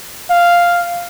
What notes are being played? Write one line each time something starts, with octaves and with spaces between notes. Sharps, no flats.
F5